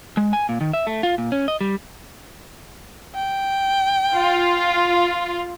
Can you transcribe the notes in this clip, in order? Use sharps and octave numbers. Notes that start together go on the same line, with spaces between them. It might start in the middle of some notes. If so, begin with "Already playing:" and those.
G#3
G#5
A#2
D#3
E5
A3
F4
A#2
C#4
D#5
G3
G5
F4